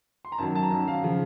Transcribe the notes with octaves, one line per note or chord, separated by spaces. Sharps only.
C6
A#5
F#2 D#3 F#3 A5
A5
A#5
F#2 D#3 F#3 A5
F5
C#3 F3